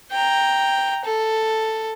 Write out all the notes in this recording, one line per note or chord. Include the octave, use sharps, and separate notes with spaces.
G5 A#5
A4